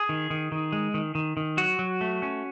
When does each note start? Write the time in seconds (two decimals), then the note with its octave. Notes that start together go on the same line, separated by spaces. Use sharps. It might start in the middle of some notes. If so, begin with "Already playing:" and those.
Already playing: G#4
0.09 D#3
0.30 D#3
0.52 D#3
0.72 G#3
0.94 D#3
1.15 D#3
1.37 D#3
1.57 F#3 F#4
1.79 F#3
2.01 A3
2.22 C#4